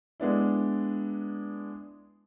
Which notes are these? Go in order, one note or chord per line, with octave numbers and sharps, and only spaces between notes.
G#3 B3 D4 E4